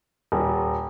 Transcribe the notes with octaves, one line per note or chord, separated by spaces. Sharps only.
D#1